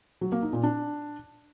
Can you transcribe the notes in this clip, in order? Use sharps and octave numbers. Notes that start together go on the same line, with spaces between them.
F#3
A#3
D#4
A#2
D4